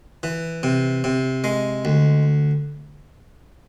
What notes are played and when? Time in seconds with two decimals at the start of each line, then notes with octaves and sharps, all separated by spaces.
0.23 E3
0.63 C3
1.04 C3
1.44 G#3
1.85 D2